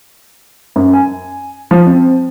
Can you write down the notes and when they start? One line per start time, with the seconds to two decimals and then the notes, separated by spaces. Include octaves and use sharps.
0.76 F#2
0.93 G#5
1.71 F3
1.87 C4